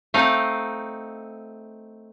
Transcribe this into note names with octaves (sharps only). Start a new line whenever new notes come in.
A3 C4 D#4 F5